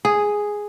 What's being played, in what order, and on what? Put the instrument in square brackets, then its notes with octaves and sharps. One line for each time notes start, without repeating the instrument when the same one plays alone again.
[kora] G#4